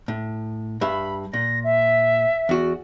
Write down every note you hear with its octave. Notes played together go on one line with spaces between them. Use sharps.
A2
G2 E5 B5
A#2 A#6
E5
E2 F#4